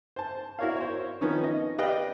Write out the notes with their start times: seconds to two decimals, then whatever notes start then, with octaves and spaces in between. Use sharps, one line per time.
0.16 C5 A5
0.59 E4 F#4 A#4 C#5 D5 F5
0.76 C5 C#5
1.21 D#3 F3 B3 C#4 D#4
1.44 D#5
1.78 G4 B4 D5 D#5 F5 G5